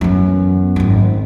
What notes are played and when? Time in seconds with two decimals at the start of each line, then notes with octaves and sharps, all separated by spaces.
0.01 F#2 E3 B3
0.76 G#1 C4